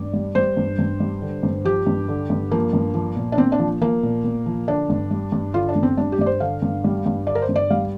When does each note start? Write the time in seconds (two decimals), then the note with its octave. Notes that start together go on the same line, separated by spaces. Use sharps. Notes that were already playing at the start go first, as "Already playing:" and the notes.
Already playing: G2 D5
0.13 G3
0.35 G3 C5
0.57 G2
0.79 G2
1.00 G3
1.22 D3
1.43 G2
1.65 F3 G4
1.86 G2
2.08 D3
2.30 G2
2.51 F3 A#3
2.73 G2
2.94 F3
3.16 A#2
3.32 D4
3.38 A#2 C4
3.52 D4
3.59 F3
3.81 F3 A#3
4.03 A#2
4.24 A#2
4.46 F3
4.68 D3 D4
4.90 G2
5.11 G3
5.32 G2
5.54 D3 F4
5.69 D4
5.75 G2
5.83 C4
5.97 G3 D4
6.12 G4
6.19 G2 D5
6.26 C5
6.40 D3 F5
6.62 G2
6.84 G3
7.06 G2
7.27 D3 D5
7.35 A#4
7.42 C5
7.49 G2
7.56 D5
7.70 G3 F5